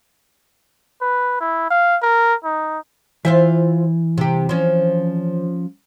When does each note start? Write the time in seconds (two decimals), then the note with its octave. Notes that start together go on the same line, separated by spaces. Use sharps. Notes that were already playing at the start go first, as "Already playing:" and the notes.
1.02 B4
1.41 E4
1.71 F5
2.02 A#4
2.45 D#4
3.25 E3 F4 C5 E5
4.18 C3 G4
4.49 F3 C#4